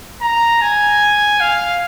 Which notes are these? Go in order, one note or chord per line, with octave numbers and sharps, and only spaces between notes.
A#5
G#5
F5